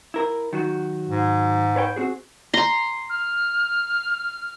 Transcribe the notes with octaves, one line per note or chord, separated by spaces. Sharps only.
E4 A#4
D#3 F#3 F#4
G#2
B4 C#5 G5
C4 F#4 G#4
A#5 C6
F6